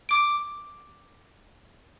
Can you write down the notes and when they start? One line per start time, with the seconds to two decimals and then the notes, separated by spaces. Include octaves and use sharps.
0.09 D6 D7